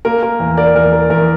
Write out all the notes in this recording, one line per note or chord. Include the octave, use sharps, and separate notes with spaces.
A#3 A#4
A#4
E2
A#4 D5
E2 A#4
A#4
E2 A#4